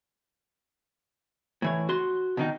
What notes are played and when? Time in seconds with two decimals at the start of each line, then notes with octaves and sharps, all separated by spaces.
1.62 A2 E3 C#5
1.89 F#4 C6
2.37 B2 D#3 D#4